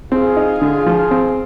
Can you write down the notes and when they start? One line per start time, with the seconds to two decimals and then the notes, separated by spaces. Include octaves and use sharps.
0.12 C4 F4 G#4
0.36 D#4
0.61 D3
0.87 F3
1.11 C4